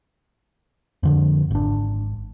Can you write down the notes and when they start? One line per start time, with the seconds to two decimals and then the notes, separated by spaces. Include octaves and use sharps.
1.03 F2 D3 F3
1.51 G#1 D4